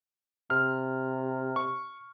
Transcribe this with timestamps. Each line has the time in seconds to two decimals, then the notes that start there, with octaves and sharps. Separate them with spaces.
0.50 C3 F6
1.56 C#6